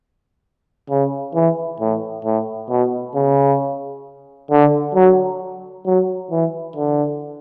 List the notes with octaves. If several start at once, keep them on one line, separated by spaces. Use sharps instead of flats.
C#3
E3
A2
A2
B2
C#3
D3
F#3
F#3
E3
D3